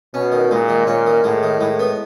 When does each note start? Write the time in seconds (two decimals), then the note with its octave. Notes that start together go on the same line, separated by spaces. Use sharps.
0.14 B2 C#4
0.32 D#3
0.51 A#2 G#3
0.69 D#3
0.87 A#2 C#4
1.06 D#3
1.24 A2 G#3
1.43 D#3
1.61 A2 G#3
1.79 B3